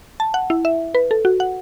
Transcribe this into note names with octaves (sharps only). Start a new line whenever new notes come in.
A5
F#5
E4
E5
B4
A4
F#4
F#5